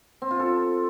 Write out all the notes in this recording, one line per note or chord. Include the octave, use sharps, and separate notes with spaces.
C4
F4
A4